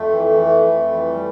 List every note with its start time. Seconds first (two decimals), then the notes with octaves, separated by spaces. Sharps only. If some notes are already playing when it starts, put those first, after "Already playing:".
Already playing: F2 A3
0.10 E3
0.29 E3
0.49 F2
0.68 F2
0.88 E3
1.06 G3